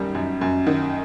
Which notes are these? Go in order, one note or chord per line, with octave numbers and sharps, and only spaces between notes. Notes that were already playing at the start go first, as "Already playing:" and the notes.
Already playing: F#2 D#3 G3
F#2
F#2
D#3